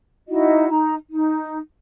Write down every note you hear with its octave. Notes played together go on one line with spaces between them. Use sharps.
D#4 E4 F#4 D#5
D#4 A#5
D#4